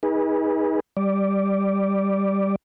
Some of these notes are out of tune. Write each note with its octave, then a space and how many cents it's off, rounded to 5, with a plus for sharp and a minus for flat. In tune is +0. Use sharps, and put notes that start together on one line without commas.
D#4 +25 G#4 -20 B4 -35
G3 +0 D5 +0